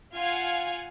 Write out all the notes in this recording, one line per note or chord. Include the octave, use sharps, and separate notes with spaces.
F4 F5 F#5 G#5 G#6